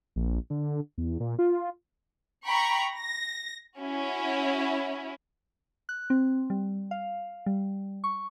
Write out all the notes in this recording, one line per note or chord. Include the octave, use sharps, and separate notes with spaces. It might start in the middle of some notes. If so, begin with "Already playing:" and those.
A#1
D3
E2
A#2
F4
G5 A#5 B5 C#6
A#6
C#4 E4 F#4
F#6
C4
G3
F5
G3
C#6